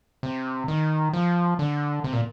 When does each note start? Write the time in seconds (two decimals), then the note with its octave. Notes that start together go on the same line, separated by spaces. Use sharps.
0.23 C3
0.68 D#3
1.13 F3
1.59 D3
2.04 C3
2.13 A#2